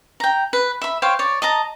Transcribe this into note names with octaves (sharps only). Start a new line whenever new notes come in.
G5 A#5
B4
E5 B5
C5 C#5 F5 G5
C#5 D5
D#5 A5 A#5